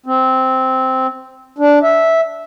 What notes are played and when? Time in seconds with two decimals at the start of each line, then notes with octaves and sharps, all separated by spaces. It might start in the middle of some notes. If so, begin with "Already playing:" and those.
0.06 C4
1.58 D4
1.83 E5